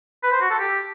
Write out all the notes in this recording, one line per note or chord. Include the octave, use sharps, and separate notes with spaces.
B4
C5
F#4
A4
G4